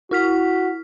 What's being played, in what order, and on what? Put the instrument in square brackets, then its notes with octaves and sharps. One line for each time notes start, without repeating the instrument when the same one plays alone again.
[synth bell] E4 F6 B6 [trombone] F#4